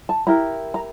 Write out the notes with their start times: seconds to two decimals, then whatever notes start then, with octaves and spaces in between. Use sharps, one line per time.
0.09 A5
0.27 E4 G4 A#4 A#5
0.74 A#5